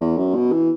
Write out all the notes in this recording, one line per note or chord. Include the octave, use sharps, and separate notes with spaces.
E2
F#2
B2
E3